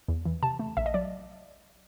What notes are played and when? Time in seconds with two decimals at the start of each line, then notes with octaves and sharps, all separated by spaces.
0.08 E2
0.25 E3
0.43 C3 A5
0.59 A3
0.77 A#1 E5
0.86 D#5
0.94 F#3 D5